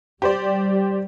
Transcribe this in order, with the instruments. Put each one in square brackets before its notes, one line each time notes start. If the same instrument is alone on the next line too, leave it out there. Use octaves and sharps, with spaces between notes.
[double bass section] G3 [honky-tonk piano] G4 C5 D5